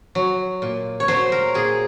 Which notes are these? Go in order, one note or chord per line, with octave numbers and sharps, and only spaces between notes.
F#3
A#2
C#5
F#3 C5
A#4
A#2 G#4